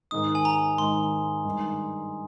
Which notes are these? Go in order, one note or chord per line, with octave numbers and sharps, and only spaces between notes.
G#2 D#3 G#3 D#4 D#6
G#5
A#5
G#2 D#3 G#3 D#4 C6
G2 D#3 G#3